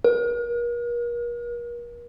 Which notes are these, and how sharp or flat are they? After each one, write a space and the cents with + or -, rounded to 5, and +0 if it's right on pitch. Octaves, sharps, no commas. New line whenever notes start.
A#4 +40